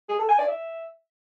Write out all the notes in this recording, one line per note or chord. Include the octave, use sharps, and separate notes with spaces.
G#4
A4
G#5
D5
E5